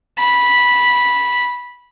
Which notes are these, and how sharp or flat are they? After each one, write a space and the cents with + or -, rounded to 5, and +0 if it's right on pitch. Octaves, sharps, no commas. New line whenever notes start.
B5 -10